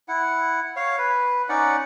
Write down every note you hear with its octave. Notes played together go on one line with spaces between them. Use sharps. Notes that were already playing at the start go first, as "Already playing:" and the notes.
E4 F#5
C#5 F5
B4
C#4 D#4 D5 F#5